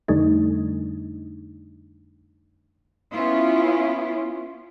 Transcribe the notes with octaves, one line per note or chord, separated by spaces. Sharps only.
F2 D3 G3 A3 D4 D#4
B3 C#4 E4 F4